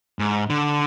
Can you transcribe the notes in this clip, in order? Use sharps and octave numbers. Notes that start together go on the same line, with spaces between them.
G#2
D3